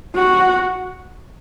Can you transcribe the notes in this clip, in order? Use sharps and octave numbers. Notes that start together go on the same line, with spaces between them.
F#4